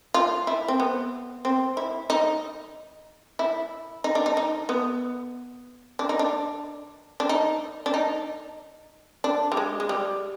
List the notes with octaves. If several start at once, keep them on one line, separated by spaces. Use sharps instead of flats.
F4
E4
C4
B3
C4
E4
D#4
E4
D#4
D4
D#4
D#4
B3
D4
D#4
D4
D4
D#4
D4
D#4
D4
G3
G#3
G#3
G3